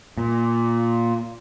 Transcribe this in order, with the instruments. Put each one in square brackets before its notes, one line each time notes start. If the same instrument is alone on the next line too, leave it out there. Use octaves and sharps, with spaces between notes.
[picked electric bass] A#2